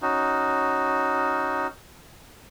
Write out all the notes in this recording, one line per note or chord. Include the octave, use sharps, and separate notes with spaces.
C#4 D#4 F#4